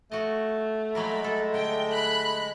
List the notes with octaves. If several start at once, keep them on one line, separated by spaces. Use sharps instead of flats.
A3 F#4 D#5
F#3 G#3 A#3 A#4 B5
A4
D3 G5
B5 F#6 B6